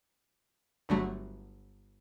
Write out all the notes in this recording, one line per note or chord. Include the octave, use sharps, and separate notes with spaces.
G1 G2 D3 F#3 A3